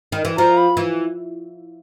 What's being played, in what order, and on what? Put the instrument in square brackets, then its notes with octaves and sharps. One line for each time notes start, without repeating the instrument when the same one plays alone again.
[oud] D#3
E3
[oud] F3 [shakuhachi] A#5
[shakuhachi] B5
[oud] E3